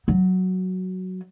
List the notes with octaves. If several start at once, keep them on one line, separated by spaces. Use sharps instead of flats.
F#3